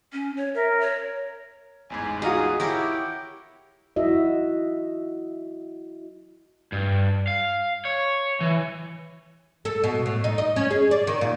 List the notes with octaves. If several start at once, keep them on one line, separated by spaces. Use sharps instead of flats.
C#4
C#5
A#4 E5
C#5
A1 E2 G#2 G#5
D#4 F4 F#4 G#4 D#6
E4 G4 A#4 C#5 F#5 G5 D6
E4 F#4 D#5 E5
G2
F5
C#5
E3
A4
B2
A2
D#4
D#5
C#4
G#4
D5
D#3
A#2